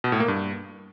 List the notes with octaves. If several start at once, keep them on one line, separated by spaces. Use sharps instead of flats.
B2
A2
A#3
G2